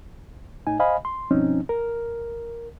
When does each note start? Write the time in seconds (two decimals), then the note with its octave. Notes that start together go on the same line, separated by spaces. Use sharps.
0.67 A2 D#4 G#5
0.79 C5 D#5 F5 G#5 B5
1.05 C6
1.30 G2 B2 F3 C4 C#4 D#4
1.69 A#4